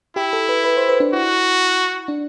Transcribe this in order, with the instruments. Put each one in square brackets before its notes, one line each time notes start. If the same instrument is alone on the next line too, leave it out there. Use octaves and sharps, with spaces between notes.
[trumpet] E4 [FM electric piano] G4
[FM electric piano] A4
B4
B4
C5
B4
D4
[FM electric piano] E4 [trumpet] F#4
[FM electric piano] D4